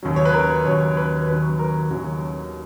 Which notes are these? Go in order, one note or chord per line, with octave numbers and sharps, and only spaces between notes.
D#2 C#3 F#3
C#5
B4
A#4
D#2 C#3 F#3 C#5
B4
D#2 C#3 F#3 B4
A#4
D#2 C#3 F#3